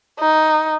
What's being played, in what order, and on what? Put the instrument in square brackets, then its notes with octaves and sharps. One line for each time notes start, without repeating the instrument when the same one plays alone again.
[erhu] D#4